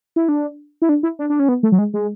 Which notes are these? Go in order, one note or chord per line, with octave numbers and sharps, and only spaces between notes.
E4
D4
E4
D4
E4
D4
D4
C#4
B3
A3
F#3
G#3
G#3